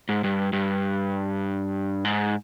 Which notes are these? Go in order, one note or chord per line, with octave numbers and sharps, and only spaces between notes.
G#2
G2
G2
G#2